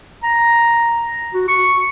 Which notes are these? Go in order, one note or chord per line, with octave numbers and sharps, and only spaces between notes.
A#5
F#4
C#6